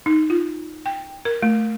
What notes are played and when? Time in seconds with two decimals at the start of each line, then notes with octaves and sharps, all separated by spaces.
0.06 D#4
0.30 F4
0.86 G5
1.25 A#4
1.42 A3